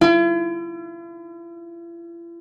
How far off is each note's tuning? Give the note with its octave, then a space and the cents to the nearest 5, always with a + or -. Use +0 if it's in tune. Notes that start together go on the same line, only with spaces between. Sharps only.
E4 +45